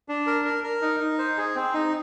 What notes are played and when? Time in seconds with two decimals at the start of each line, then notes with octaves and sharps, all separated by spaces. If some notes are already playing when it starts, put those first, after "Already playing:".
0.09 D4
0.27 A#4
0.45 A#4
0.64 A#4
0.82 D#4
1.00 D#4
1.18 C5
1.37 G#4
1.55 C4
1.74 D#4